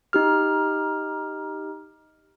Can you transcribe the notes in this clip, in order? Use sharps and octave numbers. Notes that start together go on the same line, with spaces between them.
D#4 G4 F6